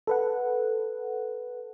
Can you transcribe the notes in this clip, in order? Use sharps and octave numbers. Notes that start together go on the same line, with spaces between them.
A4 B4 F#5